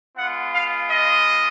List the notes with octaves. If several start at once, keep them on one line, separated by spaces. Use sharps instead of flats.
G#3 B3 F4 F#5
F5
D#5